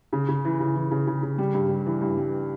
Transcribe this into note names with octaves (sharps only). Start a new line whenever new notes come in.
C#3
C#3
E3
C#3
E3
C#3
C#3
C#3
G3
G2
G3
E3
G2
G3